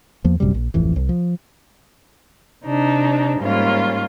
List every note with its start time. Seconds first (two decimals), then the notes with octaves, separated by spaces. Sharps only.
0.24 E2 F3 A#3
0.40 A1 F#2 C3 G3
0.54 A#1
0.74 D1 A1 F2 E3
0.96 C2
1.09 F3
2.64 C3 D4 D#4
3.39 G#2 G3 A#3 C#4 F4